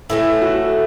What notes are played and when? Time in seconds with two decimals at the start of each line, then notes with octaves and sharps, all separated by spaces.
0.10 A2 E3 A3 E4
0.42 F#4